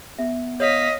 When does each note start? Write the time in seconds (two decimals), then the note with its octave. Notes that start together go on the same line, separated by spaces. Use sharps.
0.19 B3 E5
0.60 C#5 D#5 F5 B6